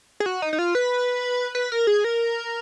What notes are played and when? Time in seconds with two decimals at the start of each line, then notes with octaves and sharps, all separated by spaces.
0.20 G#4
0.26 F#4
0.42 D#4
0.53 D#4
0.59 F4
0.75 B4
1.55 B4
1.72 A#4
1.87 G#4
2.04 A#4